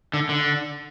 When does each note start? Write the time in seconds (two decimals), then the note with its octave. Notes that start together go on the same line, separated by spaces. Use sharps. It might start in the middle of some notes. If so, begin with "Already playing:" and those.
0.14 D3
0.29 D3